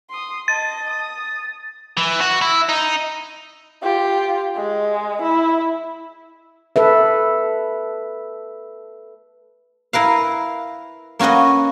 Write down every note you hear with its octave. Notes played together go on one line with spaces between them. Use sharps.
C6 D#6
D#5 A5 A6
D#6
E3
F#4
E4
D#4
F4 G4
G#3
E4
A4 B4 E5
E4 A#4 B4 F5
A#3 C#4 F#4 B4 D#5